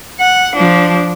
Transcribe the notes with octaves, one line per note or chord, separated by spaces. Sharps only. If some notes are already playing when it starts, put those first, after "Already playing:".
F#5
F3 D4